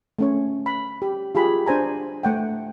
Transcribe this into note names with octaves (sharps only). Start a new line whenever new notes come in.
A3 C#4 C#5
B5
G4
F4 G4 G#4 B5
D4 C5 G#5 A#5
A3 F#5 G5